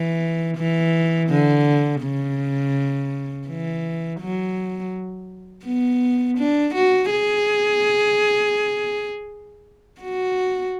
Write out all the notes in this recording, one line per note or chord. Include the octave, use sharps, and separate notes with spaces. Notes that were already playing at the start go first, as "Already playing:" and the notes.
Already playing: E3
E3
D3
C#3
E3
F#3
B3
D4
F#4
G#4
F#4